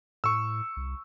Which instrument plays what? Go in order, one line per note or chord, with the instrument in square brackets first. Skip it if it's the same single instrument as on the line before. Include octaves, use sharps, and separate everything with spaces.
[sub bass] A2 [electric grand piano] C#6 E6
[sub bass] C2